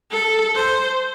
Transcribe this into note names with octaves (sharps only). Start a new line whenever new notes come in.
A4
C5